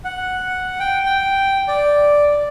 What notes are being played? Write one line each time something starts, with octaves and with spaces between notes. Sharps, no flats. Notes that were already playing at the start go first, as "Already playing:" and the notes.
F#5
G5
G5
D5